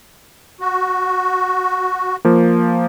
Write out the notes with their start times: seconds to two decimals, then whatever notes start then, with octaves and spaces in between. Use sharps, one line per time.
0.60 F#4
2.25 F3 A#3